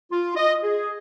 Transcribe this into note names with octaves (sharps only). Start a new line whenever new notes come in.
F4
D#5
G#4